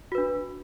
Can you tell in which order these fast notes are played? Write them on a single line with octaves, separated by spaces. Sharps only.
F#4 B4 D4